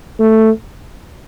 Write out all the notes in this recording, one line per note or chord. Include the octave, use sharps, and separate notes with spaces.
A3